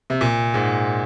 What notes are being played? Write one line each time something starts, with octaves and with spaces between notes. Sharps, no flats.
C3
A#2
G#2